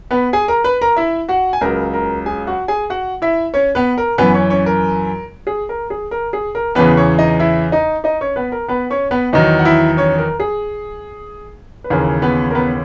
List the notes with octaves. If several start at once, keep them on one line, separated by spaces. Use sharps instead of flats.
B3 B4
G#4 G#5
A#4 A#5
B4 B5
A#4 A#5
E4 E5
F#4 F#5
G#5
C#2 C#3 F#3 A#4 A#5
A#4 A#5
G#4 G#5
F#4 F#5
G#4 G#5
F#4 F#5
E4 E5
C#4 C#5
B3 B4
A#4
F#2 E3 B3 B4
C#4 C#5
C#4 C#5
A#4
G#4
A#4
G#4
A#4
G#4
A#4
E2 C#3 E3 B3 B4
C#4 C#5
D#4 D#5
E4 E5
D#4 D#5
D#4 D#5
C#4 C#5
B3 B4
A#4
B3 B4
C#4 C#5
B3 B4
E2 D#3 F#3 D#4 D#5
F#5
E4 E5
C#4 C#5
A#4
G#4
B4
D#2 C#3 E3 A#4
B3 B4
A#4
B3 B4